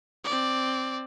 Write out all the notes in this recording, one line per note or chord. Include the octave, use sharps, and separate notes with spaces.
C4 D5